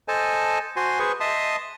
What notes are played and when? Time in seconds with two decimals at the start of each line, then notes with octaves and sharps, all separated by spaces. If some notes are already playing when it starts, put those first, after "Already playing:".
0.08 A4 C5 D#5 G#5 A5
0.76 F#4 C5 G#5 C6
0.99 G#4 B4 C5 C#6
1.20 D#5 E5 A5 C6 D#6